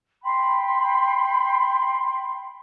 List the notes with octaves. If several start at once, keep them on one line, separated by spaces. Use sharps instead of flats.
G5 B5 C6